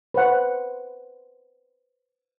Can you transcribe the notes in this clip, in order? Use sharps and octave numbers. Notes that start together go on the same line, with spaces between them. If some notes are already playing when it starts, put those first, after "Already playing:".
B4 C5 F#5